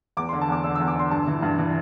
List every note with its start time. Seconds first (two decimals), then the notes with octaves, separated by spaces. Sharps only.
0.17 E2 D6
0.29 D3 C6
0.41 A5
0.48 E2 D6
0.64 D3 E6
0.75 E2 E6
0.88 D6
0.96 D3 C6
1.11 G2 A5
1.27 E3
1.42 G2
1.58 E3